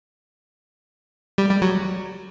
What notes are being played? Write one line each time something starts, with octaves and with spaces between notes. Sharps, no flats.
G3
G3
F#3